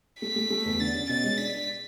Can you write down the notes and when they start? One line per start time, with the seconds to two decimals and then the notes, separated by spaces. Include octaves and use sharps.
0.21 A3 B6
0.36 A3
0.50 A3
0.65 E2
0.80 D3 A6
0.95 C#4
1.09 B2 A6
1.23 G#3
1.38 D4 B6
1.53 D4